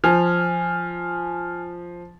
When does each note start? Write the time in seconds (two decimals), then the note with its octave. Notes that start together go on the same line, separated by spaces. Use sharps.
0.04 F3 G#5 F6